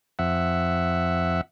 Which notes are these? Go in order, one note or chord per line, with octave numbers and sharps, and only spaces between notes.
F2 E5 F#5